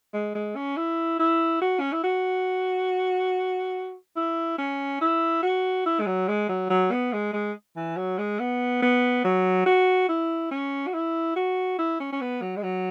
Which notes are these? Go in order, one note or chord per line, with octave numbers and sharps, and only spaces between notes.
G#3
G#3
C#4
E4
E4
F#4
C#4
E4
F#4
E4
C#4
E4
F#4
E4
G#3
F#3
G#3
F#3
F#3
B3
G#3
G#3
E3
F#3
G#3
B3
B3
F#3
F#4
E4
C#4
F#4
E4
F#4
E4
C#4
C#4
B3
F#3
G#3
F#3